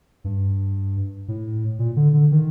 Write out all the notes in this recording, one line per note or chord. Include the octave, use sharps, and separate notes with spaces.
G2
A2
A#2
D3
D3
D#3